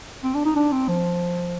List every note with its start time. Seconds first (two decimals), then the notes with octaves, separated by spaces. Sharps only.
0.23 C4
0.35 D4
0.45 D#4
0.56 D4
0.72 C4
0.88 F3